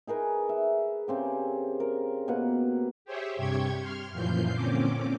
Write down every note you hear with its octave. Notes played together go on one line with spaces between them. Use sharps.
D#4 G#4 A#4 B4
E5
C#3 C4 G4
A#4
B2 A#3 B4 F#5
G4 G#4 C5 C#5 E5
G2 C3 G4 G5 C#6 G#6
C6 F6
F#2 A#2 E3 F3 G6 C7
A#2 D3 C4 C#4 D6